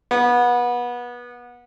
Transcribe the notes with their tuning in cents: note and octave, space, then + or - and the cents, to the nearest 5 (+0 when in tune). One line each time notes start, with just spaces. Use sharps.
B3 -25